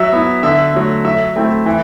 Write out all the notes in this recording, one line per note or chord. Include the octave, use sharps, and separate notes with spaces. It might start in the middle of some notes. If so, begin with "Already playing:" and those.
Already playing: F#3 E5
B3 E4
D3 E5
F#3 A3
F#3 E5
A3 C4 E4
E3